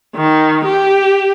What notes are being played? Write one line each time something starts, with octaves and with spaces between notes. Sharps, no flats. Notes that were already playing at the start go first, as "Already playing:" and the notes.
D#3
G4